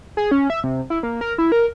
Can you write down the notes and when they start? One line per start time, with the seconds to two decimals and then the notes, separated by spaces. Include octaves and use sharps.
0.17 G#4
0.31 C#4
0.50 E5
0.64 C3
0.90 E4
1.03 A#3
1.21 A#4
1.38 E4
1.52 A#4